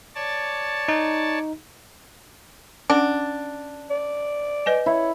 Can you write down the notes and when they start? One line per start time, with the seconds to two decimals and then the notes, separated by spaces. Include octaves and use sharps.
0.15 C#5 D5 A5
0.88 D#4
2.90 C#4 D4 F#5
3.90 D5
4.66 B4 D#5 G#5
4.86 E4 C#5